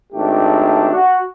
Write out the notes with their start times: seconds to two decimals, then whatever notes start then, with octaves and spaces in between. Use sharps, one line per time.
0.13 G#1 A3 D4 G4
0.92 F#4